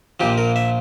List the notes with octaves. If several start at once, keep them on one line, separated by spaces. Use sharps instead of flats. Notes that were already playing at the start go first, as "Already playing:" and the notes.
A#1 A#2 F3 G4
A#4
E5